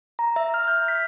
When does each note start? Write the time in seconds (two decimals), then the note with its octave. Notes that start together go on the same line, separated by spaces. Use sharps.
0.19 A#5
0.36 E5
0.54 F6
0.68 G6
0.88 B6